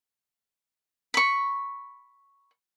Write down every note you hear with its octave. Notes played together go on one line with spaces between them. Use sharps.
B5 C#6